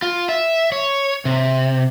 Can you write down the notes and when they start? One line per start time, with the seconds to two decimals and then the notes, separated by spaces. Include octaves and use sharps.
0.02 F4
0.29 E5
0.72 C#5
1.25 C3